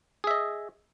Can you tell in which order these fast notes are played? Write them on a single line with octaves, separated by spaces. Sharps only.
G#4 E5 D#5